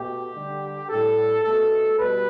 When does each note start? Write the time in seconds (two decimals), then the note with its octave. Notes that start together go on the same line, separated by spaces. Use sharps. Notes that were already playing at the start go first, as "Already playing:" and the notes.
Already playing: B2 A3 G4
0.35 D3 G3
0.90 A2 G3 A4
1.45 B2 A3 A4
1.99 B2 G3 B4